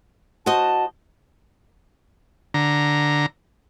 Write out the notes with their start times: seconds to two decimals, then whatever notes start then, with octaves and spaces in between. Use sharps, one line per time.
0.46 F#4 C5 D#5 A5
2.54 D3 A#5